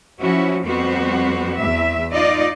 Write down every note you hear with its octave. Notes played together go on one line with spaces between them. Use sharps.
F3 C#4 E4 F#4
F2 G3 B3 C4 F#4 C5
E2 E5
D#4 F4 D5 D#5